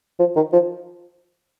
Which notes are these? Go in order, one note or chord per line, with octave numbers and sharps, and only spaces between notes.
F3
D#3
F3